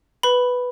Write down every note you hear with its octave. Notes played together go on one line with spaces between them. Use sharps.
B4 B5